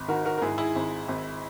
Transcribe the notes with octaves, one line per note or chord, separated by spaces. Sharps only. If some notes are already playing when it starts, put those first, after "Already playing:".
Already playing: G#1
D#3 F#4 A#4
F#4 A#4
A#4
G#2 E4 G#4
E4 G#4
G#1
G#1